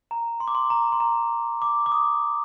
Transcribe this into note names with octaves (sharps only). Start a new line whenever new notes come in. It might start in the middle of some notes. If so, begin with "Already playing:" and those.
A#5
C6
D6
C6
A#5
C6
A#5
D6
D6
D#6